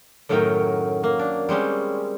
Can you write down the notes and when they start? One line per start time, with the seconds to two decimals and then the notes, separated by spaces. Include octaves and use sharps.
0.29 F#2 A2 D#3 F#3 A#4 G5
1.04 A#3
1.19 D4
1.49 G3 G#3 C4 C#4